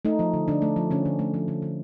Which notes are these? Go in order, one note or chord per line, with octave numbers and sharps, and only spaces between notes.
A3 D#4
F3
D3
D3 D4
A3
F3
D3 C#4
D3
A3
F3
D3
D3